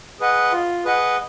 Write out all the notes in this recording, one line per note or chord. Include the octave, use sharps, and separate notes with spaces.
G#4 B4 D#5 F#5
F4
G#4 B4 D#5 F#5